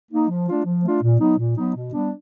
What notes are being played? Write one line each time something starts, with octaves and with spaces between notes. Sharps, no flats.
A#3 D#4
F3
A3 D4 F4
F3
A3 D4 F4
A#2
F#3 B3 D#4
A#2
F#3 B3 D#4
B2
G3 B3 D4